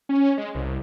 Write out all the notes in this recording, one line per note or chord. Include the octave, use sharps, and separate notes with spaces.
C#4
G#3
C2